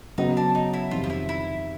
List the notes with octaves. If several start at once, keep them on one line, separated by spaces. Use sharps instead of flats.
C#3 F#3 B3 D#4
D4
D#4
E4
F2 C3 D#3 G3 C4 F4
F4
E4
E4